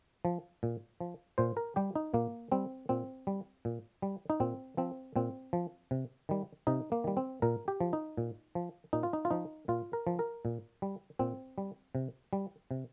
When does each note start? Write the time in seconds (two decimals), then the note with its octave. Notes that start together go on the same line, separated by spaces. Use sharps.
0.25 F3
0.63 A#2
1.01 F3
1.38 A#2 C5
1.57 A#4
1.76 G3 G4
1.95 D#4
2.14 A#2 A#3
2.52 G3 C4
2.89 A#2 C4
3.27 G3
3.65 A#2
4.02 G3
4.30 D#4
4.40 A#2 C4
4.77 F3 C4
5.16 A#2 C4
5.53 F3
5.91 C3
6.29 D#3 G3
6.67 C3 D#4
6.92 A#3
7.04 D#3 G3
7.17 C4
7.42 A#2 A#4
7.68 G4
7.81 F3
7.93 D#4
8.17 A#2
8.55 F3
8.93 A#2 D#4
9.03 F4
9.13 D#4
9.25 F4
9.31 F3 D#4
9.68 A#2 F4
9.93 A#4
10.07 F3
10.19 A#4
10.45 A#2
10.82 G3
11.19 A#2 C4
11.58 G3
11.95 C3
12.33 G3
12.71 C3